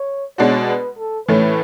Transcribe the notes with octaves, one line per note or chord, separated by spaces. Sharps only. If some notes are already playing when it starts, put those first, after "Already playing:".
Already playing: C#5
B2 G#3 D4 F#4 C#5
B4
A4
A2 E3 A3 C#4 B4